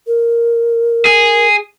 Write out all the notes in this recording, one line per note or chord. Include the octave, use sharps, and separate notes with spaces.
A#4
G#4